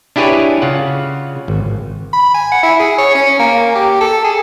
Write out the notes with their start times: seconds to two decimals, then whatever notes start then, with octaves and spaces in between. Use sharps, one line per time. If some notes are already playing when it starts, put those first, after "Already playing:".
0.16 D4 E4 G4 G#4 B4 C#5
0.62 C#3 F4 F#5
1.48 G#1
2.13 B5
2.34 G#5
2.52 F#5
2.63 E4
2.80 G#4
2.98 C#5
3.15 C#4
3.40 A#3
3.75 G4
4.01 A4
4.24 G#4